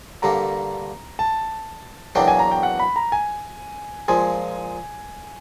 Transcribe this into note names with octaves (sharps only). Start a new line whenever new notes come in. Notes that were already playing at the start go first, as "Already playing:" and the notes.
G2 D3 G3 A#3 A#5
A5
E2 B2 F#3 A#3 D4 G5
G#5
A#5
G5
F#5
B5
A#5
G#5
A#2 F3 G#3 G#5